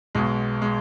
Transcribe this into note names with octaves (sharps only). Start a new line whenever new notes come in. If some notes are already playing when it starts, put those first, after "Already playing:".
B1 B2 G#3
G#3